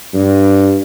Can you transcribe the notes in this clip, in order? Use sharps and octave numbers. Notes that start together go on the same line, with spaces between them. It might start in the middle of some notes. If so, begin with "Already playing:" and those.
G2